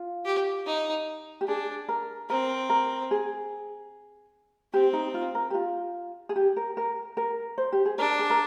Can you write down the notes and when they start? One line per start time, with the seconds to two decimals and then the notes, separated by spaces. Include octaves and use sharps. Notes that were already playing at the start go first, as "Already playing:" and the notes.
Already playing: F4
0.25 G4
0.66 D#4
1.41 G4
1.48 D4 G#4
1.88 A#4
2.29 C4 A#4
2.70 A#4
3.11 G#4
4.73 C4 G4
4.93 D#4
5.14 F4
5.35 A#4
5.50 G4
5.54 F4
6.29 G#4
6.36 G4
6.57 A#4
6.77 A#4
7.17 A#4
7.58 C5
7.72 G4
7.86 G#4
7.98 D4 A#4
8.19 G#4
8.30 A#4